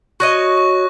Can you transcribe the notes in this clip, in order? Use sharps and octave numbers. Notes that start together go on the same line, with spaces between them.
F#4 C#5 D#5 C#6 F#6 A#6
C#6